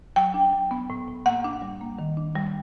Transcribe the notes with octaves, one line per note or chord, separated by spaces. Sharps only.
F#3 G5
D4
F#3
B3
A2
A2
A#3 F#5
D4
G3
A#3
D#3
D4
G3